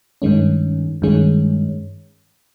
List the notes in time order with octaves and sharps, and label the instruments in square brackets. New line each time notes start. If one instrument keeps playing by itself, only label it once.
[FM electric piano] G2 D#3 G#3 C#4
G2 D#3 G#3 C#4